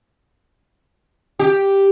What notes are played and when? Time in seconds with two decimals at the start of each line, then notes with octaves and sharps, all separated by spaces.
1.39 G4